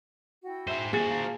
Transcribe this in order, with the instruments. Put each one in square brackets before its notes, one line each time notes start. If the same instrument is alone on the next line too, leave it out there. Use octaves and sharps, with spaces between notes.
[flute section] E4 F#4 G5
[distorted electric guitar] G#4 C5 [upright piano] E5
[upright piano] A#2 A6 [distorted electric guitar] F#4 C5 [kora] G#4
[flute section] F5 A5 A#5